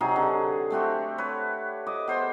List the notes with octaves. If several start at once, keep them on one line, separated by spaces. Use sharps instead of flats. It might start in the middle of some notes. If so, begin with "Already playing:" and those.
C3 F#3 D#4 G#4
D3
A3 C4 F#4 G4
B4 C#5
D#5 D6
B3 C5 E5 C6